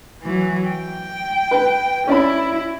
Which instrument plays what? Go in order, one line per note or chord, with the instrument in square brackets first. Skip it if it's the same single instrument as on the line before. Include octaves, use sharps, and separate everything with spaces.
[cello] E3 F#3
G5
[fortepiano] B4
[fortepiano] C#4 D5 B5 [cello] E4